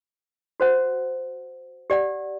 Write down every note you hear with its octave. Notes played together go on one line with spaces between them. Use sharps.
F#4 C5 F#5
G4 D5 F#5